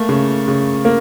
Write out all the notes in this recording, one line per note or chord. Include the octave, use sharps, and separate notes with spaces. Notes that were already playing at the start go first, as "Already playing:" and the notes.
Already playing: A3 A#3
C#3
C#3
A#3